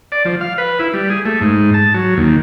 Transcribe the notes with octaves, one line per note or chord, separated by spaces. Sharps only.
D5
F3
F5
B4
E4
G3
G#4
A3
G#2
A5
F#3
D#2